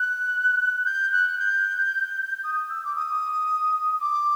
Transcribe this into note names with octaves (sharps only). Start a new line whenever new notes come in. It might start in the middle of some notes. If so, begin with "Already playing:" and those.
Already playing: F#6
G6
F#6
G6
D#6
E6
D6
D#6
D6